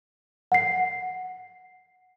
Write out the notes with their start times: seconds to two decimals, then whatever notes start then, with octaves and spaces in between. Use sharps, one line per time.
0.52 F#5 C7